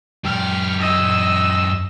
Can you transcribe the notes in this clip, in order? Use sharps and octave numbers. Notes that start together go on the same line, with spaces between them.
F#2 G4 F6
D#5 E6